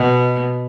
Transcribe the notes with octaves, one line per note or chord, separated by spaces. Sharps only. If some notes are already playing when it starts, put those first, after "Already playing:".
Already playing: B2